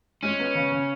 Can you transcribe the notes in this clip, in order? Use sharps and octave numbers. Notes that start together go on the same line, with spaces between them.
G#3 C#4
B3
C#3
C#3